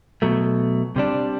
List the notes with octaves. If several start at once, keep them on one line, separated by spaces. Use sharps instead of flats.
B2 F#3 A3
C3 G3 D4